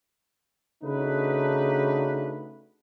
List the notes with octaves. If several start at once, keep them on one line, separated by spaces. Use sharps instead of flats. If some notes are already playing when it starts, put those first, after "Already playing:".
C#3 A3 D4 D#4 F#4 B4